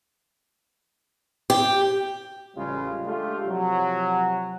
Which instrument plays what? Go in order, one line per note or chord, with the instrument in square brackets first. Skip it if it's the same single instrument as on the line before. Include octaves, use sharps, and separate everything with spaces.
[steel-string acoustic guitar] G4
[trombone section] A1 C#3 G3 G#3 F4
G#3 A3 D4 F4 G4
C3 F3 F#3